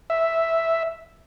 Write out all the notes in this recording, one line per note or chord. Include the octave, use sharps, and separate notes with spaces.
E5